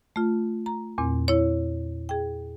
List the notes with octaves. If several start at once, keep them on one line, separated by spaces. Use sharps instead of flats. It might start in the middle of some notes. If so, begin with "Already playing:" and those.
A3 F4
A#5
E2 A#2 C4
E4 C#5
G#4 G5